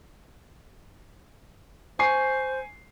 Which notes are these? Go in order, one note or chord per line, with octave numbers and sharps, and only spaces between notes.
C5 G#5 C#6 C7